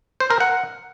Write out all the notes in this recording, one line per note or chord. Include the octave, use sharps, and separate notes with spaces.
C5
A#4
F#5